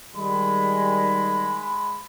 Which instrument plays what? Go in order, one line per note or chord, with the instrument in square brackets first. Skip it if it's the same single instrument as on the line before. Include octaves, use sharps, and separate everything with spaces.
[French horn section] D#3 G3 [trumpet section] G#3 B5